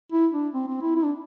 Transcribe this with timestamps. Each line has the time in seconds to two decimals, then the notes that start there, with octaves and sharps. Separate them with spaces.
0.12 E4
0.33 D4
0.54 C4
0.67 C4
0.81 E4
0.96 E4
1.04 D4